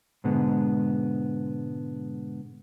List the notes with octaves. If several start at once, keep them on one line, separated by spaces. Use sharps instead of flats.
G#2 B2 D3 G#3 B3